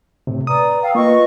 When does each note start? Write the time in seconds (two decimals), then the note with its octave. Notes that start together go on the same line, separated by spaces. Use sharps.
0.27 A2 C3
0.47 B4 D5 A#5 D#6
0.82 F5 G5 E6
0.95 A#3 F4 B4 D#5 C#6